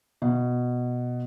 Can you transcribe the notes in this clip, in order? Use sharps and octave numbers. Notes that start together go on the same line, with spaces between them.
B2